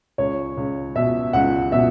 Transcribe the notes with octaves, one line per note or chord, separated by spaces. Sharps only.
C#2 C#5
C#2
B2 E5
C#2 F#5
B2 E5